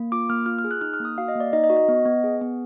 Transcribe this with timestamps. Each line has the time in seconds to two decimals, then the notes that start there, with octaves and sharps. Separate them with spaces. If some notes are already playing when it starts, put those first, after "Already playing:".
Already playing: A#3
0.12 F4 D6
0.30 A#3 F6
0.46 F4 F6
0.59 F6
0.64 G#4
0.71 F#6
0.81 D#4 F6
0.94 F6
1.00 A#3
1.05 D#6
1.18 F#4 F5
1.28 D#5
1.35 A#3
1.40 D5
1.53 D#4 D#5
1.64 D#5
1.70 F#4
1.77 D#5
1.88 B3
2.05 B3
2.24 G#4
2.41 B3